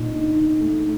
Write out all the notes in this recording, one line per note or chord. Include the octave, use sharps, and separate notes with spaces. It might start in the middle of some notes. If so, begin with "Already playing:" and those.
Already playing: A#2 D#4
D#4
D#4
A3